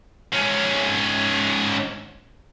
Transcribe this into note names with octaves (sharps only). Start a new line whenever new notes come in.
G#2 C#4